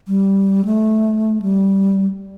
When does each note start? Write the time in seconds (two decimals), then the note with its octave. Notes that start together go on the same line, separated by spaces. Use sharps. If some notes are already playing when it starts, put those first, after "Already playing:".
0.08 G3
0.65 A3
1.42 G3